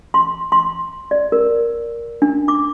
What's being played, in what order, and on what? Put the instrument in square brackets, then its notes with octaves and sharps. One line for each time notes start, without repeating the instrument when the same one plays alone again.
[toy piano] C6
C6
D5
A#4
D4
D6